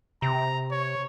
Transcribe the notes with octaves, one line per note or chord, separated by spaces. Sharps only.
C3 A#5
C#5